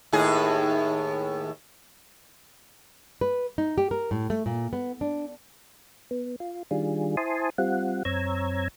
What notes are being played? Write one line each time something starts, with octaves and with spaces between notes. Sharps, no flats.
D#2 A2 G#4
B4
D#4
G4
A#4
A2
A3
A#2
B3
D4
B3
F4
D#3 G3 D4 F4 G#4
E4 C5 G#5 A5 C6 D#6
G3 C4 F4 F#5
F#2 C4 C#5 A#5 E6 G#6